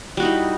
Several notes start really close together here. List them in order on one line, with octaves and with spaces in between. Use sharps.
G3 F#4 D#4 E4